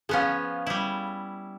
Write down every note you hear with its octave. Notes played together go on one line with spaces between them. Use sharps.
F3 B3 C#4 G#4 F5
G3 E4